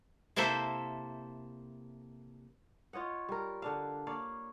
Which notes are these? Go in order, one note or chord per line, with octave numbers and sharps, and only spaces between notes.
C3 A#3 E4 A4 C5 E5
F4 C#5 D#5 F#5
G3 A#4
D3 D4 F5
A#3 C#5 D5 F5